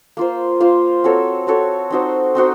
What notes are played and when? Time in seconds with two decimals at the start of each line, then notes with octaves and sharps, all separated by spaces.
0.17 A#3 F4 C5
0.60 A#3 F4 C5
1.04 C4 F#4 A4 C#5
1.47 C4 F#4 A4 C#5
1.90 C4 D#4 F#4 C5
2.35 C4 D#4 F#4 C5